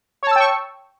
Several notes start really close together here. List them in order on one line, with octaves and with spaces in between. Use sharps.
C#5 A5 E6 G5 C#6